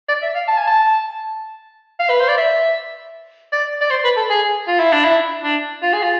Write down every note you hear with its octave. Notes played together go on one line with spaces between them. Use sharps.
D5
E5
F5
A5
G#5
A5
F5
B4
C5
D5
E5
D5
D5
C5
B4
A4
G#4
F4
E4
D4
E4
D4
F4
G#4
F4